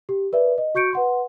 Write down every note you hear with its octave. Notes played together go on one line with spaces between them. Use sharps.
G4
A#4 B4 D5 E5
D#5
F#4 C#6 G6 C#7 D7
B4 F#5 C6